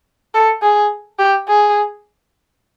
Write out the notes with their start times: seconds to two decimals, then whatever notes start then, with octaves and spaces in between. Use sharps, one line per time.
0.34 A4
0.62 G#4
1.19 G4
1.48 G#4